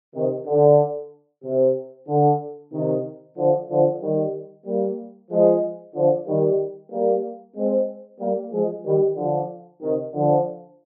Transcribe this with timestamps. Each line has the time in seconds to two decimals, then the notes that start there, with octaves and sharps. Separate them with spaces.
0.15 C3 D#3
0.47 D3
1.44 C3
2.08 D3
2.73 C3 D#3
3.37 D3 F3
3.70 D3 F3
4.01 D#3 G3
4.66 G3 A#3
5.31 F3 G#3
5.95 D3 F3
6.27 D#3 G3
6.91 G3 A#3
7.56 G#3 C4
8.20 G3 A#3
8.52 F3 G#3
8.85 D#3 G3
9.17 D3 F3
9.82 C3 D#3
10.14 D3 F3